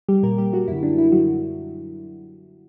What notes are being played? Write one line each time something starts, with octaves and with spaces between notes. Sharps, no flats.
G3 G4
A#2 A#3 A#4
G3 G4
F#3 F#4
F#2 D3 E4
D4
E4
F#2 D3 F#3 F#4